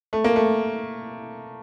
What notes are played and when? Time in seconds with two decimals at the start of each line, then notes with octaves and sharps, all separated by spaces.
0.13 A3
0.24 A#3
0.36 A3